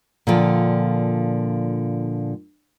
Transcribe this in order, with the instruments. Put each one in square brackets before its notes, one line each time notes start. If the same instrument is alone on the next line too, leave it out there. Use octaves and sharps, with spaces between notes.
[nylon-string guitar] A#2 D3 F3 G5